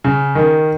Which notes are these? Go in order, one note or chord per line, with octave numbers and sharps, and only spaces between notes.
C#3
D#3